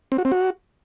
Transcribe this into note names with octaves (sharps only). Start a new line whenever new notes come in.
C4
F#4
C4
F#4